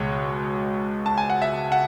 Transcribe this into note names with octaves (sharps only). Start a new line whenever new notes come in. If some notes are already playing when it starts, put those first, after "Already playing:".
Already playing: C#2 B2 G#3 C#5
A5
G#5
F#5
E5
F#5